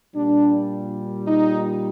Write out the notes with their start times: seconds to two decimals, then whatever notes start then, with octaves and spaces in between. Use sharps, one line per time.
0.15 A#2 G3 D4
1.27 D#4